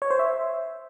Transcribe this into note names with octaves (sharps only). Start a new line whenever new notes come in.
C#5
C5
E5